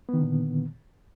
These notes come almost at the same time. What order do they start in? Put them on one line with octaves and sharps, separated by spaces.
B3 D#3 D3 A#2